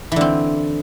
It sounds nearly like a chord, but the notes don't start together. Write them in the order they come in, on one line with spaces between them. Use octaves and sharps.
E3 D3 C4